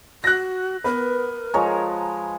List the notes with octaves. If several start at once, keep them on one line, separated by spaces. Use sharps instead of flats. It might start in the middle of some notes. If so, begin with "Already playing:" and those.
F#4 F#6 A#6
B3 A#4 B4
F3 G#3 C#5 A#5